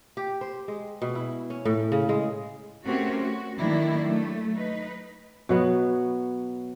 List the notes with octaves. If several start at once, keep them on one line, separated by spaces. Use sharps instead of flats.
G4
C5
G#3
B2
E4
C#4
A2
C#3
G#3
A3 C4 C#4 F#4 G4 A#4
F#4
D#3 F#3 A3 A#3 D4 E4
F#3 A3
D#4 B4
B2 F#3 B3